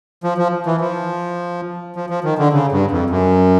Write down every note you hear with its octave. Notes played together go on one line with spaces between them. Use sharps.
F3
F3
E3
F3
F3
F3
D#3
D3
C#3
G2
F2
F#2